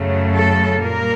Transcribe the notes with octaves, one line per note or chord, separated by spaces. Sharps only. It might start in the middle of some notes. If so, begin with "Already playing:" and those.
Already playing: F#2 C#3 F#3 A3
A4
A#2 G3 A#3 A#4